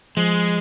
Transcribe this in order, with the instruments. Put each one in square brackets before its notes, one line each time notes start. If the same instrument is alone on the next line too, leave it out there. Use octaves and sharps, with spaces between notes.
[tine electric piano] F3 [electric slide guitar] G#3